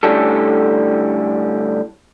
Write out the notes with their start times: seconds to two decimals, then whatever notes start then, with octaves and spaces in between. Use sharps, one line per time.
0.03 A2 D3 G3 C#4 A4